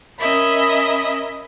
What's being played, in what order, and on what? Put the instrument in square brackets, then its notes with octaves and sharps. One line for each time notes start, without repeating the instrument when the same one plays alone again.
[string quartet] C#4 A#4 D#5 E5 B5